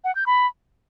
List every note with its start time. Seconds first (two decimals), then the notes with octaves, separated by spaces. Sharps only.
0.04 F#5
0.15 G6
0.26 B5